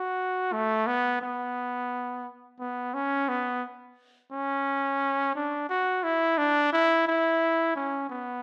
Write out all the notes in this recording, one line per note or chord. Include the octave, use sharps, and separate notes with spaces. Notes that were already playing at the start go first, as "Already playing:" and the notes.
Already playing: F#4
A3
B3
B3
B3
C#4
B3
C#4
D4
F#4
E4
D4
E4
E4
C#4
B3